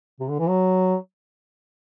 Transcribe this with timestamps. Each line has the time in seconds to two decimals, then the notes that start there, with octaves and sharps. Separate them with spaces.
0.20 C3
0.29 D3
0.39 E3
0.49 F#3